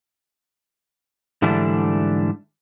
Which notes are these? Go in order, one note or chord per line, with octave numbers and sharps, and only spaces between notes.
G#2 D3 E3 G3 A3 D4